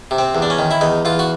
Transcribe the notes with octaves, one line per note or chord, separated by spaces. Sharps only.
C3
C4
E2
D4
C#4
D#3
E4
E2 D#4
E2 F4
F#4